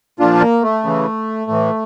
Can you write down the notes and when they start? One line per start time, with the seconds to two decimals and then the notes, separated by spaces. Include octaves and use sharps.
0.19 A#2 F3 D4 F4
0.41 A#3
0.63 A3
0.84 C#3 E3
1.47 A2 E3